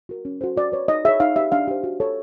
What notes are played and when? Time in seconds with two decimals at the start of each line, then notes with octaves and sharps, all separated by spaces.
0.09 F#4 A#4
0.25 C#4
0.41 F#4 A4 C5
0.57 F#4 D5
0.72 B4 C#5
0.88 D#4 D#5
1.05 G#4 E5
1.08 C#5
1.20 D#4 F5
1.36 G4 B4 E5
1.52 D4 F5
1.68 G4 C5
1.84 F#4
2.00 A4 C#5